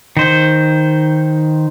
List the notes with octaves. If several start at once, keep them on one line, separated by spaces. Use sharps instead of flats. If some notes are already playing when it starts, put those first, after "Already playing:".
D#3 C5